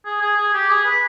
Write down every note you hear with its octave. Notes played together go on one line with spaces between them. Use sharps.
G#4
G#4
G#4
G4
G#4
B4